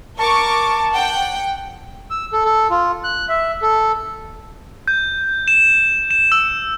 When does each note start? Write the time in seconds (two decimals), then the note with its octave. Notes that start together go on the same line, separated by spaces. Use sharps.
0.18 A#4 A5 C#6 D6
0.93 F#5 G5
2.10 E6
2.33 A4
2.45 A4
2.70 F4
3.04 F#6
3.29 E5
3.62 A4
4.88 G6
5.48 E7
6.11 E7
6.32 E6